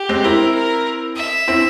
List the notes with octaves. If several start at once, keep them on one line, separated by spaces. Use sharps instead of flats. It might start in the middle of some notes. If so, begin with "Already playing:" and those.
Already playing: G4
G#3 C4
C4 E4 A#4
A#4
E5
C4 E4